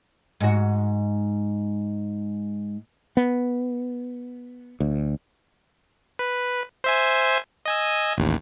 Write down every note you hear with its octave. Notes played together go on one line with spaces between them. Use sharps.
G#2 F#4
B3
D2
B4
C5 E5 G#5
D#5 G#5 E6
A1 D#2